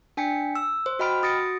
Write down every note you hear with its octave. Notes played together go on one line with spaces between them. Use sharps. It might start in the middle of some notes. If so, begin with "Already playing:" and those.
D4 G5 G#5 B6 C#7
E6
C5
F#4 D#5 G5 B5 F6 D7
F#4 D#6 A6 A#6 C#7 D7